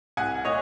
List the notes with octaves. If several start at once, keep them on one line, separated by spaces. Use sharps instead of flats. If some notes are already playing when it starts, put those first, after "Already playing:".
C2 F#5 G#5
A#2 C#5 D#5